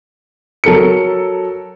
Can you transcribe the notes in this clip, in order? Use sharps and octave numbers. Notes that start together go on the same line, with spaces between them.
F#3 A4 A#4 C#7